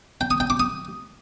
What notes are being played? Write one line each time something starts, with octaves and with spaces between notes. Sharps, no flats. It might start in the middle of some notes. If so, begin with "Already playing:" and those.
G5
D#6
G5
D6
D#6